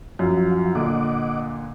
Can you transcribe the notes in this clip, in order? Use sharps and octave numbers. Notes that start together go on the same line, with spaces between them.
F#2 F3 F4 F#4
A#2 D3 D#5 F#5 D6